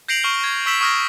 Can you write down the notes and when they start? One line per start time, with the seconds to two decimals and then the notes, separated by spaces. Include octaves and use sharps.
0.08 G6 A#6 C7 D7 F7 F#7
0.23 C#6 F6 G7
0.44 G#6 C7
0.66 C#6 E6 B6 E7 F#7
0.81 C#6 D#6 F6 G#6 A#6